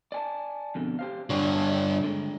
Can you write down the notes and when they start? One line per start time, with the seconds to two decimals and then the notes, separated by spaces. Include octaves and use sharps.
0.12 D5 G#5 A5
0.75 F2 B2 D3
0.99 G4 C5 F5
1.30 G2 D3 C#5
2.04 D3 G#3